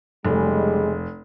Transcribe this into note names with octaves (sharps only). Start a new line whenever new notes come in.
F1 C#3 G3 G#3